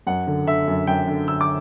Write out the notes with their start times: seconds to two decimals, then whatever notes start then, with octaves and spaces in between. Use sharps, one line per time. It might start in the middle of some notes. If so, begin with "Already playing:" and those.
0.07 F#2 F#5
0.27 D3
0.47 D3 E5
0.68 F#2
0.87 F#2 G5
1.08 D3
1.28 D3 E6
1.41 D6